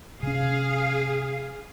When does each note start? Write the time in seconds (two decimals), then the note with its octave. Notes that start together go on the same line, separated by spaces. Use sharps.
0.23 C3 C#4 G#4 F5